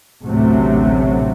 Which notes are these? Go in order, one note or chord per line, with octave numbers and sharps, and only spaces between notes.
A1 D2 C3 F#3 A3